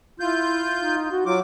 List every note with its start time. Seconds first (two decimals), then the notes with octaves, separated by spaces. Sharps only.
0.20 E4 F4 G6
0.78 D#4
1.12 F#4
1.26 F#3 F4 D6